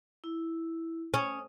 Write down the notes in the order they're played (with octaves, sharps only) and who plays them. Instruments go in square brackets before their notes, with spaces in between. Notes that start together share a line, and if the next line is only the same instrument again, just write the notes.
[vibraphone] E4
[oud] C#4 [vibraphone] D#6